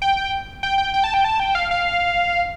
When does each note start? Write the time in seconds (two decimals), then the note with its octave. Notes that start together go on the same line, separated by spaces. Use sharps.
0.02 G5
0.17 G5
0.63 G5
0.78 G5
0.94 G5
1.04 A5
1.14 G5
1.24 A5
1.40 G5
1.55 F5
1.71 F5